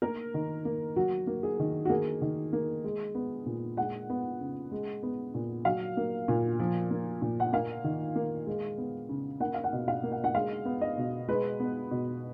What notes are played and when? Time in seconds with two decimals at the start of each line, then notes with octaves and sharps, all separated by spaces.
0.02 A#3 A#4
0.34 D#3
0.65 A#3
0.96 F#3 F#4
1.27 A#3
1.43 G#4
1.59 D#3
1.85 F#4
1.89 A#3 G#4
2.21 D#3
2.53 A#3
2.84 G#3
3.15 B3
3.46 A#2
3.77 G#3 F#5
4.10 B3
4.40 C#3
4.72 G#3
5.03 B3
5.34 A#2
5.65 F#3 F5
5.97 A#3
6.28 A#2
6.59 F3
6.91 A#3
7.22 A#2
7.40 F#5
7.53 A#3 F5
7.84 D#3
8.16 A#3
8.46 G#3
8.78 B3
9.09 C#3
9.40 A#3 F#5
9.54 F5
9.64 F#5
9.72 B2
9.88 F5
10.03 A#3
10.12 F#5
10.24 F#5
10.35 G#3 F5
10.65 B3
10.81 D#5
10.97 B2
11.28 G#3 B4
11.60 B3
11.91 B2